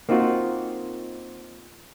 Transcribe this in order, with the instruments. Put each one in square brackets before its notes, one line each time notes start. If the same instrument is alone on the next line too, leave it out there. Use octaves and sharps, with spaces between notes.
[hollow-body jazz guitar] A#3 C4 D#4 F4 F#4